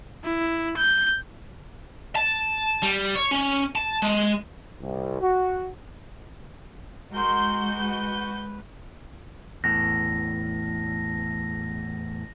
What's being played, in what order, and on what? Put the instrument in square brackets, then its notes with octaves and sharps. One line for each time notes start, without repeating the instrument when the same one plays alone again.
[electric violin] E4
G6
[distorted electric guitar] A5
G3
C#5
C#4
A5
G#3
[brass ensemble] C2
F#4
[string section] G#3 F#4 G6 [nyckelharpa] A#4 C6
[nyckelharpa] B4
[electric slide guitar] E2 A2 [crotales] A#6